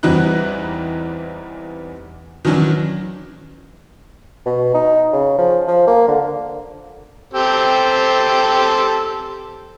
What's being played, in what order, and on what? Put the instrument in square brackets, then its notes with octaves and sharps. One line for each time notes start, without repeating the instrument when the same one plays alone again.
[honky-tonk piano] E2 E3 G3 C4 D#4 F#6
D#3 E3 F#3 C#4 D4
[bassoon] B2
D#4
C#3
F3
F3
A#3
D3
[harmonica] C4 G4 A4